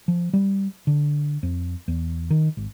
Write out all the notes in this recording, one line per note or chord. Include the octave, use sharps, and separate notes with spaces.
F3
G3
D3
F2
E2
D#3
G#1